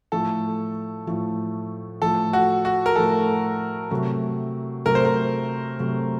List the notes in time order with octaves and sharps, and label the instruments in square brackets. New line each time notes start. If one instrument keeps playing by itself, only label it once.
[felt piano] A2 F3 A3 [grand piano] A4
[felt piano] A2 F3 A3
[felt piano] A2 F3 A3 [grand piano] A4
[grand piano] F#4
F#4
A#4
[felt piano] A2 F3 A3 [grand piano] A4
[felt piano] C3 F#3 A3
[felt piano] C3 F#3 A3 [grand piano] A#4
[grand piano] C5
A#4
[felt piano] C3 F#3 A3